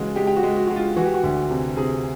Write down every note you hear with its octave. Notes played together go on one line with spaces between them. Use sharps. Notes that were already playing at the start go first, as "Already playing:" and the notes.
Already playing: C#3 E3 G#3 F#4
G#3 G4
G4
F#4
G#3
F#4
G#3 F#4
F4
E3 F#4
G4
F#4
D2
C3
C3 G#4